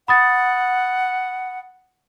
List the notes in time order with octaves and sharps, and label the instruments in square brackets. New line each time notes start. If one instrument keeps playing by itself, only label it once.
[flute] F#5 [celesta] B5 D#6 A6